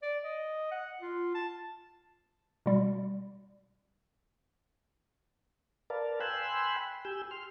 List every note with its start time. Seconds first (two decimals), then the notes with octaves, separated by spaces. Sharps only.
0.03 D5
0.24 D#5
0.72 F#5
1.02 F4
1.35 A5
2.66 B2 G3
5.90 A#4 B4 D5 F5 A5
6.20 G5 G#5 B5 C6 E6 F#6
7.05 G4 G#5 E6 G6
7.31 C6 F6